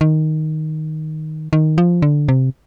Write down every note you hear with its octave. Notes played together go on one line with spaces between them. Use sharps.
D#3
D#3
F3
D3
C3